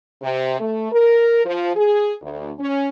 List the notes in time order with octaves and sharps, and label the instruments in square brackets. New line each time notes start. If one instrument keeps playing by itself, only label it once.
[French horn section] C3
A3
A#4
F3
G#4
D2
C#4